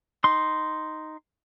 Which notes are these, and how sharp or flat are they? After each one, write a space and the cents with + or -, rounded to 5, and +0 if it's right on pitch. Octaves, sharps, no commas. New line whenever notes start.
D#4 +0 C6 +0